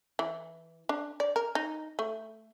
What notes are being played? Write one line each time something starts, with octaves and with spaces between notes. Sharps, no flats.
E3
D4
D5
A#4
D#4
A3